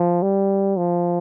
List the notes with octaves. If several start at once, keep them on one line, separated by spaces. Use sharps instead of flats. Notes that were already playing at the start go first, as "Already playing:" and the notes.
Already playing: F3
G3
F3